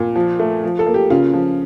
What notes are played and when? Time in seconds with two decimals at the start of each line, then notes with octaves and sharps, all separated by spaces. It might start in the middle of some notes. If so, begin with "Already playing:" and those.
Already playing: A#2
0.16 F3
0.39 A3
0.64 F3
0.79 A4
0.86 A#3
0.94 G4
1.10 C#3 F4
1.33 F3